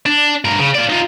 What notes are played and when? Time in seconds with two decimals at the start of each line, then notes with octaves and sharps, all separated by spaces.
0.06 D4
0.45 G2 A#4
0.60 C#3
0.75 F4 D5
0.90 D#4 F4